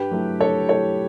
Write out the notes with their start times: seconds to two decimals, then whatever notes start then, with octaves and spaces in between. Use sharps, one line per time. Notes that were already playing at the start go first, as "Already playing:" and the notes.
Already playing: G2 G4 B4
0.11 F#3 A3 E4
0.40 G2 A4 C#5
0.69 F#3 A3 E4 A4 C#5